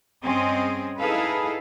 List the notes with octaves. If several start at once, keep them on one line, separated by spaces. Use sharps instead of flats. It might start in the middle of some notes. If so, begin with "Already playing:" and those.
G2 C4 C#4 G#4 D#5
D#4 E4 G#4 A4 B4 F5